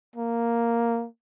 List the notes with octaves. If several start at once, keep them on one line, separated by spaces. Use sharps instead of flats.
A#3